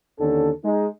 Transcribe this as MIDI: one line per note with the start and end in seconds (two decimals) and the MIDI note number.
0.19 0.50 39
0.19 0.50 50
0.19 0.50 61
0.19 0.50 69
0.64 0.85 56
0.64 0.85 63